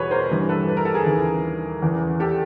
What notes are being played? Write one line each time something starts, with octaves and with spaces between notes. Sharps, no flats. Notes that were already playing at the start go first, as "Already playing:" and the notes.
Already playing: E2 B2 G3 F#4 G#4 B4 C#5
A#4 C5
G2 E3 G3
A4 B4
B4
A#4
A4
G#4 A#4
D#2 C#3 E3
E2 C#3 E3
G4 A4